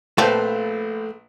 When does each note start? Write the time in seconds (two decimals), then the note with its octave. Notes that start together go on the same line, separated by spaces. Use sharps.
0.18 A#1 F3 A3 C4 B4 C5